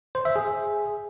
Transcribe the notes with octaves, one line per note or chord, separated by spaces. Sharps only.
C5
E5
G#4